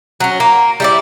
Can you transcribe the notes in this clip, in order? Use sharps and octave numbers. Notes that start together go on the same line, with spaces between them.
F#3 C#4
A#3
G3 E4 D5